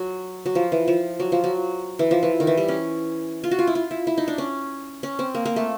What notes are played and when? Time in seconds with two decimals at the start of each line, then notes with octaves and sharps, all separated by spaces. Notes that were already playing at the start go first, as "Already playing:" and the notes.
Already playing: F#3
0.46 F#3
0.55 F3
0.72 E3
0.88 F3
1.20 F#3
1.32 F3
1.44 F#3
1.99 E3
2.11 F3
2.23 E3
2.40 D#3
2.47 E3
2.57 G3
2.68 C#4
3.44 F4
3.51 F#4
3.59 F4
3.67 E4
3.75 F4
3.91 E4
4.07 E4
4.18 D#4
4.28 D4
4.38 C#4
5.03 C#4
5.19 C4
5.35 A#3
5.45 A#3
5.56 A3